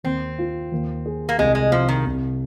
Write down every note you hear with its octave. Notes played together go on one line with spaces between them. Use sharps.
D#2 C4
F4
D#2
G#4
A#3
C2 G#3
G#3
C2 F3
D#3
C2